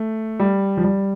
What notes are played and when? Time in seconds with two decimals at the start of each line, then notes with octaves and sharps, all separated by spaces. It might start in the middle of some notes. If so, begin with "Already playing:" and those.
Already playing: A3
0.40 G3
0.77 F3
0.84 G3